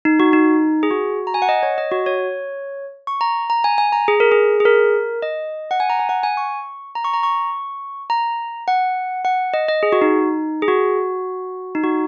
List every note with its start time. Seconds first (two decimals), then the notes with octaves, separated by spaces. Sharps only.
0.05 D#4
0.20 F#4
0.33 D#4
0.83 G#4
0.91 F#4
1.27 A#5
1.34 G#5
1.42 F#5
1.49 D#5
1.63 C#5
1.78 D#5
1.91 F#4
2.06 C#5
3.07 C#6
3.21 A#5
3.50 A#5
3.64 G#5
3.78 G#5
3.92 A#5
4.08 G#4
4.20 A#4
4.32 G#4
4.60 G#4
4.65 A#4
5.22 D#5
5.71 F#5
5.80 G#5
5.90 A#5
5.99 G#5
6.09 F#5
6.23 G#5
6.37 C#6
6.95 A#5
7.05 C#6
7.14 A#5
7.23 C#6
8.10 A#5
8.68 F#5
9.25 F#5
9.54 D#5
9.68 D#5
9.83 G#4
9.92 F#4
10.02 D#4
10.62 G#4
10.68 F#4
11.75 D#4
11.84 F#4